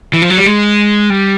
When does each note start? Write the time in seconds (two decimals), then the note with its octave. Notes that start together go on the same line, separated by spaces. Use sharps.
0.13 E3
0.22 F3
0.30 F#3
0.37 G3
0.46 G#3
1.10 G3